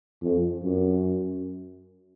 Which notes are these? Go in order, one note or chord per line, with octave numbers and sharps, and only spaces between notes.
F2
F#2